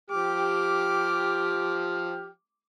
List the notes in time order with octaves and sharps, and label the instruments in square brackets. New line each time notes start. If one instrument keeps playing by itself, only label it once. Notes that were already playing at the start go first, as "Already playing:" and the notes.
[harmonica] F3 F6 [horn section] G4 [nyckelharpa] D6